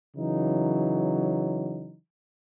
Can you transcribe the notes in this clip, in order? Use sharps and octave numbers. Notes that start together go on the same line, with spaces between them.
C#3 E3 F#3 D#4